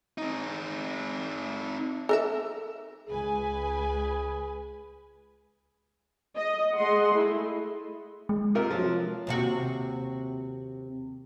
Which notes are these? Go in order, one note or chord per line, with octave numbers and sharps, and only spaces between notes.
C4 D#4
A4 A#4 E5
C#2 G#4 B4 G#5
D#5
G#3 D#5 F#5 C6
A3 E4 G#4
G#3
C3 F4 A#4
F3 F#3
D#2 C3 F#4